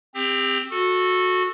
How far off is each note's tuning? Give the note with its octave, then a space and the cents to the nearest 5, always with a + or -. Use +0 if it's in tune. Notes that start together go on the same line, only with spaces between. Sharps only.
C4 +0 G4 +35
F#4 -20 A4 +0